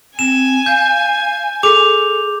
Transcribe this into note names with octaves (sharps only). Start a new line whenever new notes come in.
C4 G#5 E7
F5 G6
G#4 A4 D6 F7